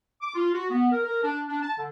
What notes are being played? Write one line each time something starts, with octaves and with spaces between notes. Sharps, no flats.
D6
F4
F#4
B3
A#4
A#4
D4
D4
A5
D3